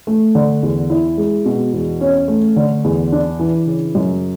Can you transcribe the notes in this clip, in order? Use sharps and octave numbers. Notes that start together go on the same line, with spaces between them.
A3
D3
E2
E4
G#3
B2
E2
C#4
A3
D3
E2
D4
E3
C#3
F#2